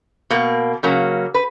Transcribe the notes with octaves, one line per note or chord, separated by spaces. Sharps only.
B2 A#3
C#3 F#3 A#3
B4